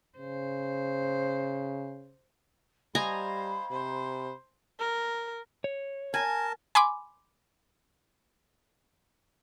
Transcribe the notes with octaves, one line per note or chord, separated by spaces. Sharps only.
C#3 C5
G3 C5 D#5 F5 G#5 A#5 B5
C3 C5
A#4
C#5
A#4 G#5 A5
G#5 B5 C6 D6